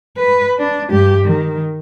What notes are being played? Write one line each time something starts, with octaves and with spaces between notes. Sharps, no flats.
B4
D4
G2 G4
D#3